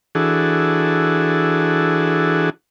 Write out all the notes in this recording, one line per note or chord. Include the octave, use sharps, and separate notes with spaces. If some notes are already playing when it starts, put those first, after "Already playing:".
E3 D4 F#4 G#4 A4